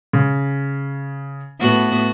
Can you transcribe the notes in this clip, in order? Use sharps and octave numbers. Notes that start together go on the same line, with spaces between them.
C#3
A2 B3 F#4